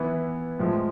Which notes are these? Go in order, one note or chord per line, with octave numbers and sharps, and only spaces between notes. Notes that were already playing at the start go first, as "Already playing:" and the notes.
Already playing: E3 B3 E4
A2 F3 G#3